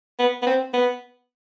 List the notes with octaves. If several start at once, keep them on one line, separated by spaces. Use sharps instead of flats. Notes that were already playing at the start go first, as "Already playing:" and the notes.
B3
B3
C4
B3